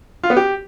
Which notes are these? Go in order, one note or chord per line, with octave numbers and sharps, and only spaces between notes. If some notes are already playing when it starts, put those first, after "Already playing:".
F4
B3
G4